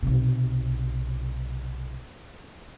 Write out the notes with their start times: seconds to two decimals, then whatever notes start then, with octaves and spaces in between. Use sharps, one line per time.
0.03 B1 C3